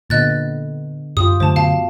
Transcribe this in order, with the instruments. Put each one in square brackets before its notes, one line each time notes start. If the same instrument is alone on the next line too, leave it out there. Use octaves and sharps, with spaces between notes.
[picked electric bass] A#2 [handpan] D3 B3 [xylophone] D#5 F#6 A6
[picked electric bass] F#2 [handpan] F4 G4 [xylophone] D#6
[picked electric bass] F#2 D3 A3 [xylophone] C5 A5
[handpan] B2 [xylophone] F5 A5